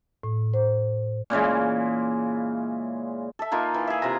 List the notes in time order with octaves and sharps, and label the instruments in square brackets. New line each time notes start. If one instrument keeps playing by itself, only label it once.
[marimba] A2
C5
[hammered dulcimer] A#2 C#3 E3 G#3
A4 E5
A#3 D#4 F4
E3
G#4 E5
C3 F4 A#5